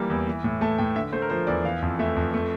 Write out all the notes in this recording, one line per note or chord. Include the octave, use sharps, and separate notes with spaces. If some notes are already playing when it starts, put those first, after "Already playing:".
Already playing: E3 G3 A#3
E2
E3
A2
A3 A5
A2 G5
D3 E5
A3 C5
A#4
F3 C5
E2 D5
E3 F5
F2
A3 E5
F2
A3